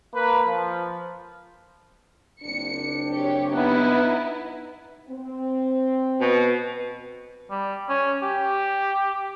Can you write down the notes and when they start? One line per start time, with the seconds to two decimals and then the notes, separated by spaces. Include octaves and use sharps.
0.14 A#3 B4
0.46 F3
2.43 F#1 C4 D4 C#7
3.14 G4 C#5
3.53 B3 D#4 E4 B4
5.10 C4
6.21 B2
7.51 G3
7.90 C#4
8.22 G4